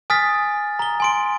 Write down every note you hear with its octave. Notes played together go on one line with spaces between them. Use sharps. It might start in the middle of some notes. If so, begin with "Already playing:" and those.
G#5 D#6 F6 A6 B6
A#5 G7
G#5 C6 D7